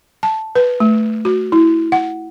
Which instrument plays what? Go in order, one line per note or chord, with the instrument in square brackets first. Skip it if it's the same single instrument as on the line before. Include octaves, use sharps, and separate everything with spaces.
[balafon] A5
B4
A3
F#4
E4
F#5